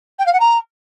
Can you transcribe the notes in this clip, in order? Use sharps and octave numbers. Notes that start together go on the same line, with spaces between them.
G5
F5
F#5
A#5